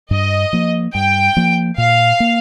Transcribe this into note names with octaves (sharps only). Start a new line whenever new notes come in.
G2 D#5
F3 A#3
G2 G5
F3 A#3
A#2 F5
A#3